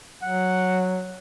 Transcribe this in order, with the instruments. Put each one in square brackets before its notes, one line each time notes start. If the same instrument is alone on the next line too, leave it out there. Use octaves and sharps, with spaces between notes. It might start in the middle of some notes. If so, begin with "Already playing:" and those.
[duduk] F#3 [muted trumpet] F#5